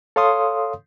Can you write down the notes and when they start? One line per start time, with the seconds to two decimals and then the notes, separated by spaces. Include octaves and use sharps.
0.16 A4 C#5 F5 C6 D#6